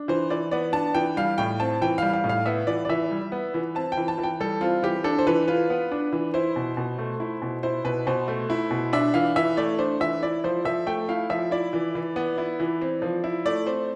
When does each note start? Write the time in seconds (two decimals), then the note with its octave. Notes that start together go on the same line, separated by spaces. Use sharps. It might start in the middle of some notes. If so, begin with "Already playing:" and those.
Already playing: D4
0.08 E3 C5
0.30 E3 D5
0.51 B3 D5
0.73 D4 A5
0.95 E3 G5
1.17 G3 F5
1.38 A2 G5
1.60 C4 A5
1.82 E3 G5
1.98 G3 F5
2.13 F5
2.24 A2
2.29 F5
2.46 B3 E5
2.67 E3 D5
2.85 D5
2.89 E3 E5
3.11 G3
3.32 B3
3.54 E3
3.75 C4 A5
3.92 G5
3.97 E3
4.08 A5
4.18 E3
4.23 G5
4.40 G3 A4
4.61 C4 F4
4.83 E3 G4
5.04 D4 A4
5.19 C5
5.27 E3 B4
5.48 F4 B4
5.70 B3
5.92 D4
6.13 E3
6.34 E4 C5
6.56 B2
6.77 B2
6.98 A3
7.20 E4
7.42 B2
7.63 E4 C5
7.84 B2 B4
8.07 B2 C5
8.28 A3
8.50 E4
8.71 B2
8.93 D4 E5
9.14 E3 F5
9.36 E3 E5
9.57 A3 D5
9.79 D4 C5
10.00 E3 E5
10.23 E4 D5
10.44 F3 C5
10.65 F3 E5
10.87 A3 G5
11.09 E4 F5
11.30 F3 E5
11.51 E4 D5
11.73 E3
11.95 E3
12.16 B3
12.38 E4
12.60 E3
12.82 C4
13.02 F3
13.24 E4
13.45 A3 D5
13.67 C4 C5